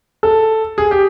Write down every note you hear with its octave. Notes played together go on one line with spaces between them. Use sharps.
A4
G#4
G4